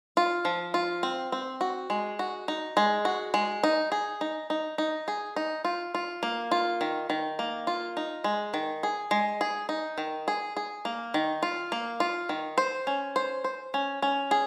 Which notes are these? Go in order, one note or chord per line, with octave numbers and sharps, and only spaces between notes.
F4
F3
F4
C4
C4
F#4
G#3
F#4
D#4
G#3
F#4
G#3
D#4
G#4
D#4
D#4
D#4
G#4
D#4
F4
F4
A#3
F4
D#3
D#3
A#3
F4
D#4
G#3
D#3
G#4
G#3
G#4
D#4
D#3
G#4
G#4
A#3
D#3
F4
A#3
F4
D#3
C5
C#4
C5
C5
C#4
C#4
G#4